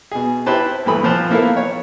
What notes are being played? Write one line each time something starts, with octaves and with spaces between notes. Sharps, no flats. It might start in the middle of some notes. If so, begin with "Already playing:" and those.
B2 G#4
E4 G4 B4 C5 A5
G2 A#2 E3 A3 B5 D#6
A#2 F3 C5 A5 F#6
A#3 B3 E4 A4 A#4 F5
C#5